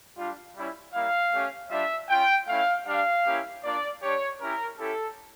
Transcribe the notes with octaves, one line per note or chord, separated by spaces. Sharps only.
G3 D4 F4
G3 C#4 E4
G3 A#3 E4 F5
A3 C#4 G4
G3 D4 F4 E5
C#4 F4 G5
A3 C#4 E4 F5
G3 D4 G4 F5
A#3 C#4 E4 G4
A#3 D4 F4 D5
G3 D4 G4 C#5
C#4 E4 G4 A#4
C#4 E4 G4 A4